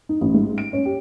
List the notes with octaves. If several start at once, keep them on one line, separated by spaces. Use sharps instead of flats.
D#4
A1
G#2
D7
C#4
G4